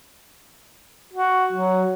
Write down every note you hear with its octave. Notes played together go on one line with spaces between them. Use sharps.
F#4
F#3